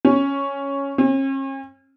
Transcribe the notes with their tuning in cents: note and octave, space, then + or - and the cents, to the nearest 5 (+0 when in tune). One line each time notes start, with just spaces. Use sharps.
C#4 +0
C#4 -40